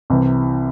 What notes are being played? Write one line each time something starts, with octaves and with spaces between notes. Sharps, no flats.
C2 C3 E3